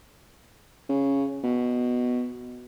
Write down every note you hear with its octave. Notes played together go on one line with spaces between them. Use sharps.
C#3
B2